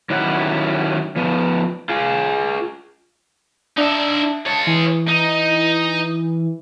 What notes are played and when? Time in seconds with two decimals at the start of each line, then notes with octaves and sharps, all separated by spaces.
0.10 D#3 F#3 C#4 E4 G4 F#5
1.16 F3 B3
1.89 F4 G#4
3.77 D4 D#4 E5
4.46 G#3 C#5 A5
4.67 E3
5.08 D#4